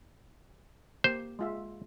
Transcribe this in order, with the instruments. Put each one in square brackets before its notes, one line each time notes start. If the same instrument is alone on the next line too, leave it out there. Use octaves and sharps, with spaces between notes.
[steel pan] A#3 G4 [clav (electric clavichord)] C5
[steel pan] G#3 F4 E5